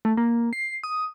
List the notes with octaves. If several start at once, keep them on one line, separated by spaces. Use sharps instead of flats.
A3
A#3
C7
D#6